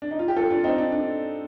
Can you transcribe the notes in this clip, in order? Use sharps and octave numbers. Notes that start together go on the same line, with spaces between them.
D4
D#4
F4
G4
F4 A4
D4 F4
C4 D#4
D4
D4